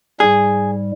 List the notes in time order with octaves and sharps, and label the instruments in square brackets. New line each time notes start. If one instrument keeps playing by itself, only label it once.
[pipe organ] G#2 G3 [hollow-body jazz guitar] G#4